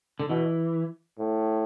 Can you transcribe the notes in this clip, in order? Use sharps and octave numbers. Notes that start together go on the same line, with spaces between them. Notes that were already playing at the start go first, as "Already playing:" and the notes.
D3
B2 E3
A2